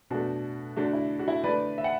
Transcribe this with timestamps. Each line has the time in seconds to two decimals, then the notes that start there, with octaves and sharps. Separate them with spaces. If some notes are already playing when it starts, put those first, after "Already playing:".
0.10 B2 A3 D4 F#4
0.76 D3 A3 D4 F#4
0.93 E4
1.19 F#4
1.28 E4
1.44 D3 A3 B4 D5
1.78 E5
1.84 F#5